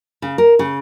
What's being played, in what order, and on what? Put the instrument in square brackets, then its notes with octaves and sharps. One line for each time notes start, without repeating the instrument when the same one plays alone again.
[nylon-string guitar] C#3
A#4
C#3